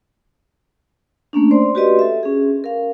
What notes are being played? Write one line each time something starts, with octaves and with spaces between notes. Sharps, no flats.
A3 A#3 C#4 D4
C5 D5 C6
F#4 G4 B4 D5 D#5 C6
A4 E5
C#4 G#4
A#4 F5